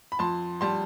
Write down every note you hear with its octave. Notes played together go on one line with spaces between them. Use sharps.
B5
F2 A5 C6
G3 A5 C6